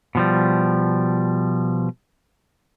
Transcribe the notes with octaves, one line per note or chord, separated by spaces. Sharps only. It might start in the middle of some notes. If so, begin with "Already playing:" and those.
B2 F3 G3